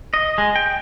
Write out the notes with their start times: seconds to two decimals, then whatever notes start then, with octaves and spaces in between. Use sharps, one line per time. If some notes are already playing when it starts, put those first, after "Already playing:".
0.14 D#5
0.38 G#3
0.56 G5